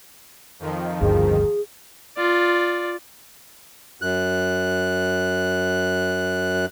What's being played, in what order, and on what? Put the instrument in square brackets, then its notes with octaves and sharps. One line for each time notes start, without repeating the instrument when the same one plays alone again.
[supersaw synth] F2 D#3 F3
[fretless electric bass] G1 D2 G2 [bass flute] G#4
[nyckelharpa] F4 D5
[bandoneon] F#2 F#6